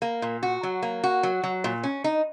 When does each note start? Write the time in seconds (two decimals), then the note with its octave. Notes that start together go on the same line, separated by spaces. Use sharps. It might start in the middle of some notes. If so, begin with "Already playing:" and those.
0.02 A#3
0.22 A#2
0.43 F#4
0.63 F#3
0.83 A#3
1.04 F#4
1.23 F#3
1.44 F#3
1.64 A#2
1.83 C#4
2.04 D#4